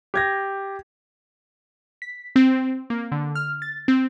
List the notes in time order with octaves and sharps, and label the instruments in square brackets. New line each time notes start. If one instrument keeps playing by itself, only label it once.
[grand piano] G4 G#6 A#6
[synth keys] B6
C4
A#3
D3
F6
A6
C4